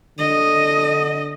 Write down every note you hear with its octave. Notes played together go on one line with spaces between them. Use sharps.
D3 D#5